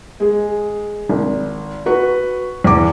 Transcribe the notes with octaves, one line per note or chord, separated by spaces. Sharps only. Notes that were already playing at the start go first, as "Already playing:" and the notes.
G#3 G#4
G#1
F#4 B4 C#6
E2 D6